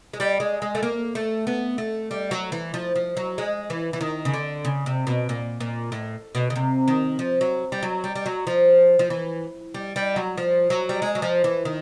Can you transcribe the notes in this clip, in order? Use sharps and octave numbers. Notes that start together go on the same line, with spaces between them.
G#3
G3
G#3
G#3
A3
A#3
A3
B3
A3
G3
F#3
E3
F3
F3
F#3
G#3
E3
E3
D#3
C#3
D3
C#3
C3
B2
A#2
A#2
A2
B2
C#3
C3
D#3
F3
F#3
G3
F#3
G3
G3
F#3
F3
F3
E3
G3
G3
F#3
F3
F#3
G3
G#3
F#3
F3
E3
D#3